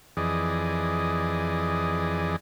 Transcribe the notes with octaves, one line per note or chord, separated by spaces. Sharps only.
F2 E3 G#4 D5 D#5